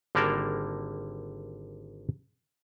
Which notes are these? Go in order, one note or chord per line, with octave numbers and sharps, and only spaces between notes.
G#1 D3 G3 A#3 A#4 A5